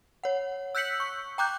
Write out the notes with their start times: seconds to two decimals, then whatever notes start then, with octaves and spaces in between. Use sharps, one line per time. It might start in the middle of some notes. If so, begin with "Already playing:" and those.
0.23 C#5 F#5
0.75 E6 F#6 G6 B6 C#7 F#7
1.00 C#6
1.38 G5 A#5 D6 F#6 G6